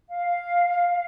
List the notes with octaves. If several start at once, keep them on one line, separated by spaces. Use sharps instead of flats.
F5